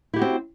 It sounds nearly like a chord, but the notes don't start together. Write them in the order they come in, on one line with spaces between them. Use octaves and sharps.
E4 G4 F#4 C4